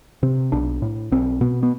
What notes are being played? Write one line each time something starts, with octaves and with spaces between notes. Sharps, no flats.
C3 C4
B1 D4
A2
B1 C4
B2 B3
B3